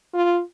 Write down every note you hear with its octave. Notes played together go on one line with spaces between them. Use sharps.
F4